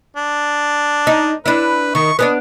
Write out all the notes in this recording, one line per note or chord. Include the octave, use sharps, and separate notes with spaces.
D4
D#4
D4 E4 B4
D#3 C#6
B3 C#4 D4 D#5